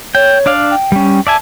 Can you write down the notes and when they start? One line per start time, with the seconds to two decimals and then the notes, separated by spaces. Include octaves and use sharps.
0.15 C#5 G5
0.46 D4 D5 F5
0.71 G5
0.92 G3 C#4
1.27 D5 E5 G#5 A5